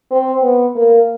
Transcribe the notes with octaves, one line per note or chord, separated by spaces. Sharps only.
C4
B3
A#3